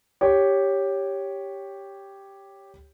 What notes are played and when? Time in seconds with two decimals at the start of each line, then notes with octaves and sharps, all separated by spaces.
0.21 G4 C#5